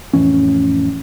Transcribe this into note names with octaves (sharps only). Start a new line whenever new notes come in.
F2 A2 E3 C#4